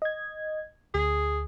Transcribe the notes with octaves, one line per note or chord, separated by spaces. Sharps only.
D#5 G#6
D2 G#4